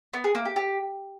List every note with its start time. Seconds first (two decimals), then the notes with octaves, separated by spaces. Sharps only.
0.13 B3
0.24 G#4
0.35 A#3
0.45 G4
0.56 G4